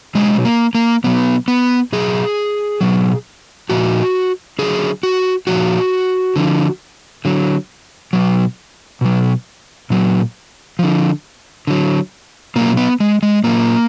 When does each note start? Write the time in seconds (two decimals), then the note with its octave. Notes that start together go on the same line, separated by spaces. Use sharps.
0.15 B2 F#3 G#3
0.45 A#3
0.75 A#3
1.04 B2 F#3 B3
1.48 B3
1.93 B2 F#3 G#4
2.81 B2 F#3
3.70 A#2 F3 F#4
4.59 D3 F#3 G#4
5.03 F#4
5.47 A#2 F3 F#4
6.36 D3 F3
7.25 D3 F#3
8.13 B2 F#3
9.01 B2 F#3
9.90 A#2 F#3
10.79 D3 F3
11.67 D3 F#3
12.56 B2 F#3 A#3
12.77 B3
13.00 G#3
13.23 G#3
13.44 A#2 F#3 A#3